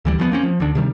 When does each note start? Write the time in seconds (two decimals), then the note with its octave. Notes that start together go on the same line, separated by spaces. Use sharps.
0.05 D2 E3 G3
0.18 E2 F3 A3 B3
0.32 A#3 C4 C#4
0.43 F3
0.60 D2 D3 D4
0.75 C3 D#3 G3